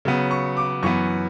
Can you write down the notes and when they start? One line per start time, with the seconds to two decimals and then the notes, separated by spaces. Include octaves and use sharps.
0.05 C#3 F#3 B3
0.31 C#6
0.57 D6
0.83 F#2 E3 B3 C#6